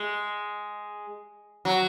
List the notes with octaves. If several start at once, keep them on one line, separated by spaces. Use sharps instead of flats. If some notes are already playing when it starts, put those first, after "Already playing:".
Already playing: G#3
F#3